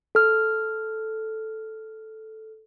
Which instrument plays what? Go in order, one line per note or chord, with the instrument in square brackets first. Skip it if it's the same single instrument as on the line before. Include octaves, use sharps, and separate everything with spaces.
[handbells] A4 F6